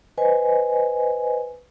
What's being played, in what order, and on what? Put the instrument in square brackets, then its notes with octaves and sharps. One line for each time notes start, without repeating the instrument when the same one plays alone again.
[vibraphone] B4 C5 D#5 G#5